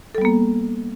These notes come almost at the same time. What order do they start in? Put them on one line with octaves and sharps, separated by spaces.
A4 G3 B3 A#3